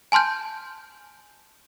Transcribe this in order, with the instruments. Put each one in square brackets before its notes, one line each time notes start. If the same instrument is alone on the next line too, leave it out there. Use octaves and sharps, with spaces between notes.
[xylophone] G#5 A5 C6 F6 G6